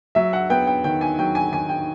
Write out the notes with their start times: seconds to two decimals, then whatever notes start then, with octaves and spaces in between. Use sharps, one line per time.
0.15 F#3 E5
0.33 F#5
0.50 B3 G5
0.67 G5
0.84 D#3 G5
1.01 G#5
1.18 F#3 G5
1.35 G#5
1.52 D#3 G#5
1.69 G5